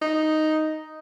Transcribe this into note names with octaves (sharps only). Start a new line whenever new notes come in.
D#4